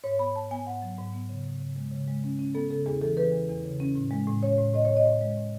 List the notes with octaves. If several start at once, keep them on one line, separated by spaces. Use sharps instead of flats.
G#2 C#5
B3 B5
G#2 A5
B3 G#5
G#2 F#5
F#3
G#2
B3
C#3
C#3
C#3
G#3
C#3
G#3
C#4
C#4
B3 A4
C#3 A4
E2 G#4
E3 A4
E3 B4
E2
E2
C#3
C#4
A2
G#3
A2
C#4 C#5
A2
A2 D#5
A2 C#5
D#5
A2
G#3
A2